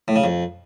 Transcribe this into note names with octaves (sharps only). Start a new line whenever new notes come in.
A2
C#3
F2